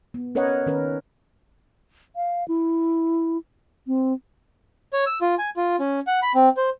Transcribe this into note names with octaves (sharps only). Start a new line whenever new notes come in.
B3
C#4 A#4 B4 C#5 D#5 F#5
D#3 C#4 A#4 B4
F5
E4
C4
C#5
E6
F4
G#5
F4
C#4
F#5
B5
C4
C5